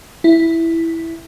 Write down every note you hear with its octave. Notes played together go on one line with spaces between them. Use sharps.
E4